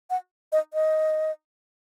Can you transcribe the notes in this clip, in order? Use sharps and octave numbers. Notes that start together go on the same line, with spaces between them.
F#5
D#5
D#5